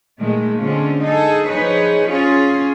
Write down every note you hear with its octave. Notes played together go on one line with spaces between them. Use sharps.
A#2 D#3 G#3 A3
D3 G#3 C4 C#4 F4
D#4 G#4 A4
F3 D#4 G#4 B4 C#5
C#4 F4 G#4